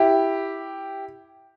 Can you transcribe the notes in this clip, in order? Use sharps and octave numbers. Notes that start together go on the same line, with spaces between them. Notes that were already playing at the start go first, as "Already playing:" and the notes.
Already playing: E4 G4